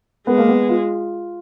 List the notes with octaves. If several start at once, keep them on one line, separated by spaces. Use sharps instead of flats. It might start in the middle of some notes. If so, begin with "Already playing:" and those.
G#3 B3
A#3
B3
F4